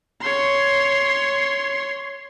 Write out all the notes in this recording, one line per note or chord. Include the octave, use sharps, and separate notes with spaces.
C#5 C6